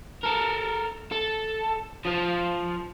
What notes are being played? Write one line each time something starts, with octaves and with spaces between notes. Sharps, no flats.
A4 A#4
A4
F3 F4